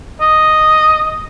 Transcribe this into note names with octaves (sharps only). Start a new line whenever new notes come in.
D#5